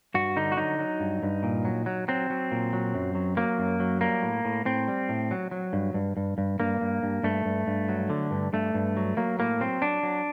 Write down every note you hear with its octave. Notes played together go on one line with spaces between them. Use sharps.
G2 F#4
D3 D#4
F#4
F#3 D#4
F#3
G2
G2
A#2
F#3
F#3
F#3 C4
F#3
A#2
F#3
F#2
F#3
F#3 A#3
F#2
F#3
G3 A#3
A2
A2
A2 C4
G3
A2
F#3
F#3
G2
G2
G2
G2
G2 A#3
G2
G2
G2 A3
G2
G2
F#3
D3
G2
G2 A3
G2
F#3
F#3 A#3
A2 A#3
F#3 C4
F#3 D4
F#3